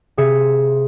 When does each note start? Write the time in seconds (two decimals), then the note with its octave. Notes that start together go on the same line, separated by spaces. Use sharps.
0.17 C3 C4 G#4 E5 C#7